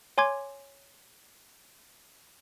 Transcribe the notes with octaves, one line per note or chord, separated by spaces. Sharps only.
C#5 G#5 C6 D6 G#6